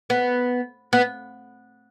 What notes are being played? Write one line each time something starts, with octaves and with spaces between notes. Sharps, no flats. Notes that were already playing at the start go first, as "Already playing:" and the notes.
B3
B3